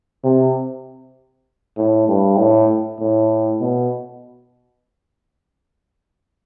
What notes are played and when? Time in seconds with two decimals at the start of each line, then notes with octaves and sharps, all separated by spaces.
0.24 C3
1.77 A2
2.08 G2
2.38 A2
3.00 A2
3.61 B2